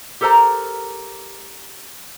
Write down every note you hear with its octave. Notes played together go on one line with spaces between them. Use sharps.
G4 A4 A#4 C5 A#5